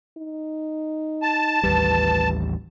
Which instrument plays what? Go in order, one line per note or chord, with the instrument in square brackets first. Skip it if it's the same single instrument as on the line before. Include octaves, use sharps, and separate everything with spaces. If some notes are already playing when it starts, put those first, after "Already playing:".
[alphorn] D#4
[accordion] A5
[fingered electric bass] A1 D#2 G3 [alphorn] B4